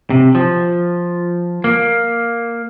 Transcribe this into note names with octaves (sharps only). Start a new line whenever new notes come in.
C3
F3
A#3